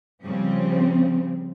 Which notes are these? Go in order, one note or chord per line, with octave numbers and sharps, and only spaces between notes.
C#3 F3 G3 C4